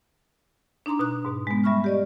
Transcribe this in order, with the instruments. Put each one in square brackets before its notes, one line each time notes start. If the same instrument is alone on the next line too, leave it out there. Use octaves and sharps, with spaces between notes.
[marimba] D4 D#4 A#5 C6 D6
B2 D#4 F#6
G#2 B2
G#3 B3
G3 E5 B5 C#6 F6
G4 D5 D#5